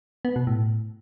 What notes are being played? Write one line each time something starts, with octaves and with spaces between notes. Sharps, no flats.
B3
B2
A2